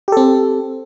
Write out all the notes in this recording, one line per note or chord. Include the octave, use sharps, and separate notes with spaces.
C4 G4 A4